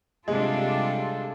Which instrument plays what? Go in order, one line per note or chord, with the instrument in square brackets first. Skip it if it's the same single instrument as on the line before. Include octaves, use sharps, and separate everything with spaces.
[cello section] C3 G3 D4 [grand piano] G#3 [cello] F4 A4